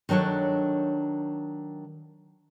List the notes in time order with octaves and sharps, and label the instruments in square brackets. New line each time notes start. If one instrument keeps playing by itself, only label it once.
[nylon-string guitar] D#3 F#3 D4 A4 C#5